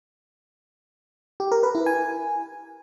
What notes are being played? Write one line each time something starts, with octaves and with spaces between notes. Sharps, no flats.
G4
A#4
B4
E4
G#5